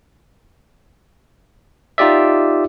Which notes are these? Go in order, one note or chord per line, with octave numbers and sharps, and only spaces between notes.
D#4 F4 G4 D5 E5